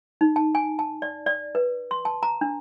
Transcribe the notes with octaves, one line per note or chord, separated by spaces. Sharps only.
D#4
A5
G#5
A5
D5
D5
B4
C6
A5
A#5
D4